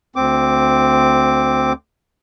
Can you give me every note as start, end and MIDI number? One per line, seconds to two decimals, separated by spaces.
0.16 1.73 38
0.16 1.73 60
0.16 1.73 86